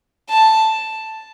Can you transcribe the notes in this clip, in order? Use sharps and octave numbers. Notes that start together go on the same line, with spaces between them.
A5